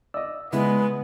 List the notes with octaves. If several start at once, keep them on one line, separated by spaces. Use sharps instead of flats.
D5 D#5 E6
C#3 G#3 B3 E4